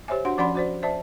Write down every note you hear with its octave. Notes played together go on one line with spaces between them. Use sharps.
G4 C5 C#5 E5 G#5
D4 F#4 F#5 C6
F3 C#4 D5 F#5 B5 C6
F#4 C5 D5
C5 D5 E5 A5